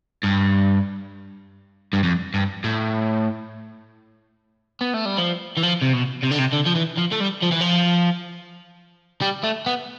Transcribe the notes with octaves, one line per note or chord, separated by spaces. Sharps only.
G2
G2
F2
G2
A2
B3
A3
G3
F3
E3
F3
C3
B2
C3
D3
C3
D3
F3
E3
F3
A3
G3
F3
E3
F3
G3
A3
B3